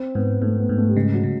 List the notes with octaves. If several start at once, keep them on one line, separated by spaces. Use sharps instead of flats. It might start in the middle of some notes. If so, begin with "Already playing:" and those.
Already playing: C4
G#2 B3
G#2 A3
B3
G#2
A3
G3
C#3 G#3
F#3
C#3